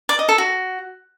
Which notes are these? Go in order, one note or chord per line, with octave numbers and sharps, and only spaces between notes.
D5
D#5
A4
F#4